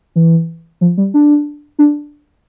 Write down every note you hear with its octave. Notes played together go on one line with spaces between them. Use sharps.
E3
F3
G3
D4
D4